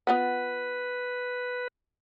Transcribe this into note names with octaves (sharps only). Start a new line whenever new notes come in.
B3 F4 B4 F#5